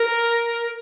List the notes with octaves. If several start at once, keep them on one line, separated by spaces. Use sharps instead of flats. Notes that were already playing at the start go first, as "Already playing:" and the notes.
Already playing: A#4